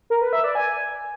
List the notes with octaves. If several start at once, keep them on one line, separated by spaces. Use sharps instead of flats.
A#4
B4
E5
D5
G#5